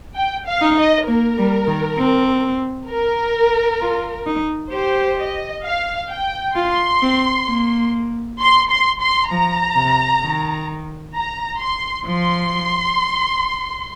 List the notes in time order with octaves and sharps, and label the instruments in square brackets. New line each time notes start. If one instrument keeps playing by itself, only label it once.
[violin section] G5
F5
[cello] D#4
[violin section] D#5
[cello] A#3 [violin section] A#4
[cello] G3
D#3
C4
[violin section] A#4
[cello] F4
D#4
[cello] G4 [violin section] C5
[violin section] D#5
F5
G5
[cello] F4 [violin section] C6
[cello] C4
A#3
[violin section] C6
C6
C6
[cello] F3 [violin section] A#5
[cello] C3
D#3
[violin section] A#5
C6
[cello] F3 [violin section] C6